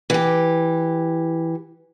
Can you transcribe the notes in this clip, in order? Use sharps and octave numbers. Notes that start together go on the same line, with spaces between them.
E3 G4